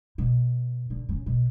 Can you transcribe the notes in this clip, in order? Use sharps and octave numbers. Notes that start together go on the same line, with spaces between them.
B2
D3
C#3
B2